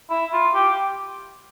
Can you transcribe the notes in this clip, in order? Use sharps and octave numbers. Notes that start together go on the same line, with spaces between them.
E4
F4
G4